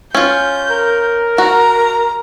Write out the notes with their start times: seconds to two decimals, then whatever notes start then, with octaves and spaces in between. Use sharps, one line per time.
0.15 C#4 F4 G6
0.71 A#4
1.38 F#4 A#5